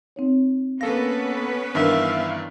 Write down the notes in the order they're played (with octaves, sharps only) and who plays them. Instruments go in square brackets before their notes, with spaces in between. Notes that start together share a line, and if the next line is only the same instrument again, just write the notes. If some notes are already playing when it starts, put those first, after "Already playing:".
[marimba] C4 D#4 C#5
[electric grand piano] A#3 A4 A#6 [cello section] B3 C#4 B4 [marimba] F5
[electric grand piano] G2 D#3 E3 [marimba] D4 A#4 [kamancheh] E5 F5